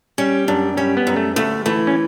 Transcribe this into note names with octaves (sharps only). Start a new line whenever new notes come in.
G3 C#4
F#2 D4
G3 C#4
B3
F#2
A3
D2 A3
E3 A3
C#4